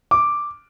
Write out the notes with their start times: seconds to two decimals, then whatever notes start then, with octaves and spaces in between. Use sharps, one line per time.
0.11 D6